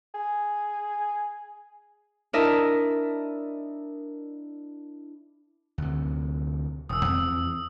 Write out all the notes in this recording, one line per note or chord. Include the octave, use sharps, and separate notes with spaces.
G#4
D4 E4 A#4 D#5 E5 A5
D2 C3
E1 D#6 E6
E2 C4